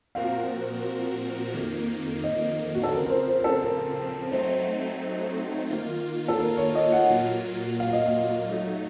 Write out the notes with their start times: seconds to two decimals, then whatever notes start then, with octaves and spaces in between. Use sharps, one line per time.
0.15 A#2 F3 C4 F#4 A#4 F5
1.53 F2 D#3 A#3
2.24 D#5
2.75 F#4
2.83 A4
2.92 C#3 F3 C4 A#4
3.06 A#4
3.10 C5
3.28 C5
3.40 A#4
3.44 A4
3.62 A#4
4.32 F#3 A3 C4 D#4 C5
5.71 D#3 A#3 F4
6.28 A4
6.40 A#4
6.57 C#5
6.75 D#5
6.92 F#5
7.09 A#2 F#3 A#3 F4
7.80 F5
7.93 D#5
8.06 F5
8.49 F#3 A3 D#4